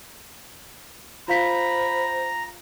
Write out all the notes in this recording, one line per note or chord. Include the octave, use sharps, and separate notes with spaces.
F4 C5 F5 A#5 B5 B6